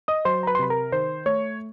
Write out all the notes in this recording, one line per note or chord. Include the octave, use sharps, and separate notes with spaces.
D#5 D#6
F#3 C5 C6
A#5
B4 B5
C6
C3 B5
A#4 A#5
D#3 C5 C6
A3 C#5 C#6